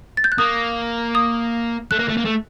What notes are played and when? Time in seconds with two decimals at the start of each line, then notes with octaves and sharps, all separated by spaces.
0.17 A6
0.24 G6
0.32 F#6
0.38 A#3 D#6
1.15 D#6
1.91 A3 F#6
1.99 A#3
2.09 A3
2.17 A#3
2.25 A3